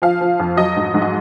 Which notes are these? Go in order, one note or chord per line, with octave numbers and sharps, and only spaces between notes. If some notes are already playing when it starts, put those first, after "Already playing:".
F3 F5
F3
F2
F#3 D#5
G#2
G#2
D#5